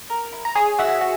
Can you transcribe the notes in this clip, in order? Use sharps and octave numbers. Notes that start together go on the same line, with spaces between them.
A#4
E4
A#5
G#4 C#5 G#5
F#4 E5 F#5
F#4